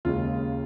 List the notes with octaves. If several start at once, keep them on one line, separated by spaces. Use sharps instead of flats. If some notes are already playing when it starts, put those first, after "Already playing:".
D#2 C#3 G#3 F4